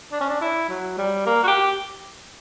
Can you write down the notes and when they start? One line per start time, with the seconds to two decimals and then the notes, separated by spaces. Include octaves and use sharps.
0.12 D4
0.21 C#4
0.29 D4
0.41 E4
0.69 F#3
0.98 G3
1.26 A#3
1.43 F#4
1.48 G4